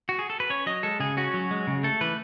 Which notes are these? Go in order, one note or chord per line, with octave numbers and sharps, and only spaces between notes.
F#4
G#4
A4
B4
C#4 C#5
F#3 D#5
G#3 A4
C#3 G#4
C#4 F#4
F#3
G#3
C#3
A3 A4
E3 B4